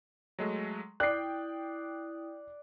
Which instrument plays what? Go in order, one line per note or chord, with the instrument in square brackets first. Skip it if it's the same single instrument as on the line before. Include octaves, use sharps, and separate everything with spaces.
[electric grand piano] F#3 G#3 A3
[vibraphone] E4 D#6 [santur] D5 [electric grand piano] G5 [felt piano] F#6 C7